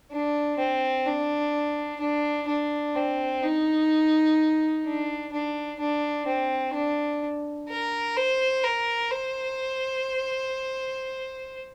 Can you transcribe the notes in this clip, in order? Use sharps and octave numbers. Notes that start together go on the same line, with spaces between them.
D4
C4
D4
D4
D4
C4
D#4
D4
D4
D4
C4
D4
A#4
C5
A#4
C5